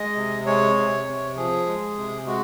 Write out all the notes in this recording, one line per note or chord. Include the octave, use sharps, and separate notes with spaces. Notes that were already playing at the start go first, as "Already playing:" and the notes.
Already playing: G#3 D#5
C3
G#3 C#5
C3
C3
F3 G#4
G#3
C3
G#3 F#4